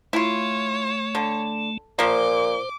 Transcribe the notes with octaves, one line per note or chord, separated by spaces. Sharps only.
A3 E4 F4 C#5
D3
A#2 F3 A#3 C5 D6